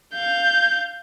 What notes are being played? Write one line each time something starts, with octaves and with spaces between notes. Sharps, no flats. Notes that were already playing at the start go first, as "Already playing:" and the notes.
F5 G6